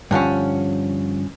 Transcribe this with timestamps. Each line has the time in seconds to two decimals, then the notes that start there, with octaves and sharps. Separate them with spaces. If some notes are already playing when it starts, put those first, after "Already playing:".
0.11 G2 D3 F3 C#4